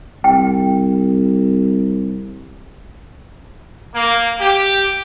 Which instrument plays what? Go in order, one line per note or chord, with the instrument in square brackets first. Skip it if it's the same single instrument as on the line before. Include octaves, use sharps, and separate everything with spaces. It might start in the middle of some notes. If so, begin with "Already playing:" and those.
[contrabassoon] C2 [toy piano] G5
[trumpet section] A#3
G4